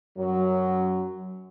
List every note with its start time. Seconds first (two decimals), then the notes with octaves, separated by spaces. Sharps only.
0.18 F#2 F#3